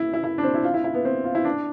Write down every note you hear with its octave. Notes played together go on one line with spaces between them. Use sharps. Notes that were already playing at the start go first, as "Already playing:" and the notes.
Already playing: E4
E4
E4
D4
C4
E4
F4
E4
E4
B3
C4
F4
E4
D4